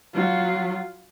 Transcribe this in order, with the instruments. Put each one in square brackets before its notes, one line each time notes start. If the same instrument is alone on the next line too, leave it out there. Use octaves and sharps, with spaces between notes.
[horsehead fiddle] F#3 F4